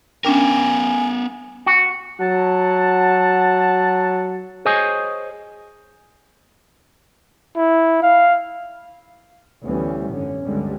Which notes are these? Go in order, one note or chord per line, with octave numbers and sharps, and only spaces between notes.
B3 C#4 D4 A#4 G5 G#5
F#4
F#3 F#5 A5
G#4 C5 C#5 D#5 G#5
E4
F5
D2 E3 G3 B3 C#4
G#1 F#2 D3 C#4
G1 C#2 G2 D3 G3 G#3